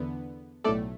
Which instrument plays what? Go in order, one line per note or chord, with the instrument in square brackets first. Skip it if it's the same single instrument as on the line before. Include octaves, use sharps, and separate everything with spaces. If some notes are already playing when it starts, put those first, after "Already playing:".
Already playing: [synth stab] E2 D3 B3
B1 A2 A3 A4 D5